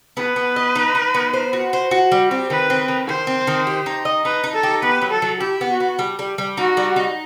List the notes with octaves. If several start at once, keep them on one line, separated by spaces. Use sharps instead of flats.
B3 B4
B3
D#5
D#4
D#4
B3
C5
F#4
C5
F#4
G3
C4
D#3 B4
C4
D#3
D#3 C5
C4
D#3
G4
D#4
D#5
D#4 B4
D#4
A4
G4
B3 B4
F#3
A4
F#3
E4 G4
B3
F#4
B3
G3
G3
G3
D#4 F#4
G3
D#4